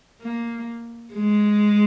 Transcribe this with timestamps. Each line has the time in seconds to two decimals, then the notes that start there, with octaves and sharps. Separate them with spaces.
0.21 A#3
1.14 G#3